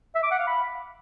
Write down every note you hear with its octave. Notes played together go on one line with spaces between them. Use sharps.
E5
D6
F#5
F5
B5